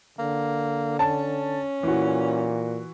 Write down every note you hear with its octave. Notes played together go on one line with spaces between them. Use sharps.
D3 A#3
C#4 A5
A#2 E3 F#4